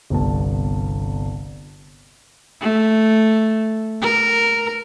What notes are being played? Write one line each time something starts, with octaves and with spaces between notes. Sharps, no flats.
G1 C2 B3 A5
A3
A#4